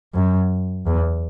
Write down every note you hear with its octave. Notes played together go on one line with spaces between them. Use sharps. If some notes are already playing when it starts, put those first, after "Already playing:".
F#2
E2